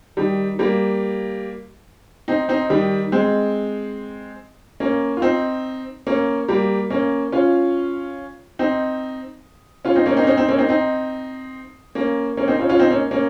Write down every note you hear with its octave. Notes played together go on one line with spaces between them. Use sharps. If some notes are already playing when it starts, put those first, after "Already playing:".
D#3 G3
G3 A#3
C4 D#4
C4 D#4
D#3 G3
G#3 C4
A#3 C#4
F4
C4 D#4
A#3 C#4
G3 A#3
A#3 C#4
C#4 F4
C4 D#4
C#4 F4
C4 D#4
A#3 C#4
C4 D#4
C#4
C4 D#4
C4 D#4
A#3 C#4
C4 D#4
C4 D#4
A#3 C#4
A#3 C#4
C4 D#4
C#4 F4
C#4 F4
C4 D#4
A#3 C#4
A#3 C#4